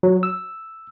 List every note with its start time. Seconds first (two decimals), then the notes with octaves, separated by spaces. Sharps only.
0.03 F#3
0.23 E6